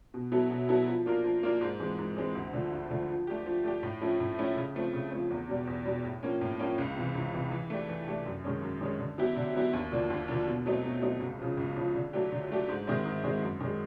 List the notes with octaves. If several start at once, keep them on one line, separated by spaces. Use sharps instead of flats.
B2
F#3 B3 E4 A4
B2
F#3 B3 E4 A4
F3
A#3 D4 F4 A#4
F3
A#3 D4 F4 A#4
G#2
E3 G#3 C4
G#2
E3 G#3 C4
D2
D3 F3 A3
D2
D3 F3 A3
F3
A3 D4 G4
F3
A3 D4 G4
A2
F3 A3 C#4 E4
A2
F3 A3 C#4 E4
C#3
F3 A3 C4
C#3
F3 A3 C4
E2
B2 G3
E2
B2 G3
A2
F3 A#3 C#4
A2
F3 A#3 C#4
C#2
C3 E3
C#2
C3 E3
E3
A3 D4 G4
E3
A3 D4 G4
F#2
D#3 G#3 C#4
F#2
D#3 G#3 C#4
D3
F#3 B3 E4 G4
D3
F#3 B3 E4 G4
D#2
D3 F3 A#3 D4
D#2
D3 F3 A#3 D4
B2
F#3 A3 C4 D#4
B2
F#3 A3 C4 D#4
C#2
C#3 F3
C#2
C#3 F3
D3
F#3 A3 D4 G4
D3
F#3 A3 D4 G4
G#2
D#3 G#3 C4 E4
G#2
D#3 G#3 C4 E4
F#2
D#3 G#3